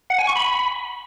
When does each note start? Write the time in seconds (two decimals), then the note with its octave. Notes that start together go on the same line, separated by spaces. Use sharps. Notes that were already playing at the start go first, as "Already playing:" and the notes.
0.10 F#5
0.19 G#5
0.27 C#6
0.36 B5